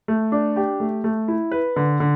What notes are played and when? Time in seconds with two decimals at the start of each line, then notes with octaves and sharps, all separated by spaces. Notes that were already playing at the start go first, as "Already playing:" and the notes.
0.08 A3
0.32 D4
0.56 G4
0.80 A3
1.04 A3
1.28 E4
1.52 B4
1.76 D3
2.00 D3